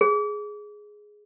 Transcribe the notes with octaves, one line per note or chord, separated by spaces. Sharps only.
G#4